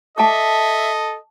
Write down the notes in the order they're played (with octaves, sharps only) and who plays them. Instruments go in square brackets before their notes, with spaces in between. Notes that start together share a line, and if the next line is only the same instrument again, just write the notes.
[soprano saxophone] A4 [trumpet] D#5 [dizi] E5 [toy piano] A5 D6